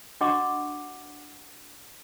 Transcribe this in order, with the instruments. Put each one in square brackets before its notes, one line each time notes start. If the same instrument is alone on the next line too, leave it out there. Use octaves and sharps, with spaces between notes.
[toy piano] D4 F#4 D#5 F#5 C#6 D6